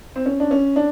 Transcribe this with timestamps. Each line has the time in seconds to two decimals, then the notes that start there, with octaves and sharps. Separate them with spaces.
0.16 C4
0.26 C#4
0.40 D4
0.51 C#4
0.76 D4